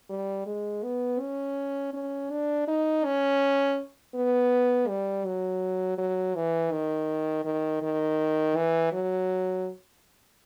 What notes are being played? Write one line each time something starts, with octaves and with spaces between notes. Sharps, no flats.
G3
G#3
B3
C#4
C#4
D4
D#4
C#4
B3
G3
F#3
F#3
E3
D#3
D#3
D#3
E3
F#3